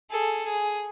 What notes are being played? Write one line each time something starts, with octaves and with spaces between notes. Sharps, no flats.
G#4 A4
G#4